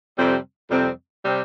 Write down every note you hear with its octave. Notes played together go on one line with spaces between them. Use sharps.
F2 C3 G3 C4
F2 C3 G3 C4
C3 G3 C4